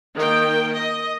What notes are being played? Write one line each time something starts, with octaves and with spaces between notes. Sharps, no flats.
D#3 A#3 G5
D#5